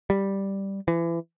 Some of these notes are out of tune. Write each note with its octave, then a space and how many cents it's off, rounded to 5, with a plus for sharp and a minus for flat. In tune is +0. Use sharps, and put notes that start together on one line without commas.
G3 +0
E3 +30